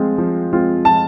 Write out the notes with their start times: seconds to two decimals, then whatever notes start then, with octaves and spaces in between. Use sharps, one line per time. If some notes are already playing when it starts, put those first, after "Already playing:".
Already playing: F3 G#3 C4 F4
0.18 F3
0.52 G#3 C4 F4
0.85 F3 A5